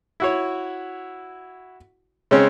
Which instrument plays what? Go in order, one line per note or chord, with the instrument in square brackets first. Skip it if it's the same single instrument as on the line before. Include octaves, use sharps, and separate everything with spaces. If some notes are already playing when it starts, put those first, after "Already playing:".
[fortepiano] E4 F#4 C#5
C#3 G#3 C4 C#4